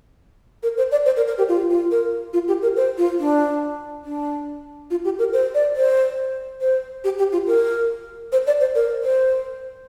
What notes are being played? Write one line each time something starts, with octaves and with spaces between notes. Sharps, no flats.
A#4
C5
D5
C5
A#4
A#4
G4
F4
F4
A#4
F4
G4
A#4
C5
F4
D4
D4
F4
G4
A#4
C5
D5
C5
C5
G4
G4
F4
A#4
C5
D5
C5
A#4
C5